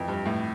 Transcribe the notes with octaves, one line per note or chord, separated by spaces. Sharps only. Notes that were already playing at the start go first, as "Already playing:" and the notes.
Already playing: F2 E3
G2
A2